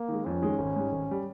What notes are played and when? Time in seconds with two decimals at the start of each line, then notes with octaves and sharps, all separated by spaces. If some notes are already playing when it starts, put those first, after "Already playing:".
Already playing: A#3
0.08 D#3 G#3
0.25 F2 C#4
0.42 D#3 G#3
0.59 G#1
0.76 G#2 G3
0.92 G#1
1.11 G3